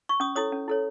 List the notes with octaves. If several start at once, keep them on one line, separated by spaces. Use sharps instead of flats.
C#6
C#4 D#6
E4 A4 C#5 D#6
C#4
E4 A4 C#5